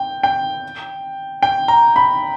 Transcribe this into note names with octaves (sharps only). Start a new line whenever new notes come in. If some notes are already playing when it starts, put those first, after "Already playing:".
Already playing: G5
G5
G5
A#5
B5